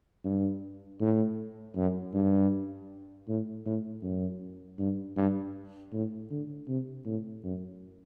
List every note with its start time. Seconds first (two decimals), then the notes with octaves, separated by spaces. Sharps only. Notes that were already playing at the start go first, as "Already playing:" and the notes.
0.24 G2
1.01 A2
1.76 F#2
2.13 G2
3.28 A2
3.66 A2
4.03 F#2
4.79 G2
5.17 G2
5.93 A2
6.31 D3
6.68 C3
7.06 A2
7.44 F#2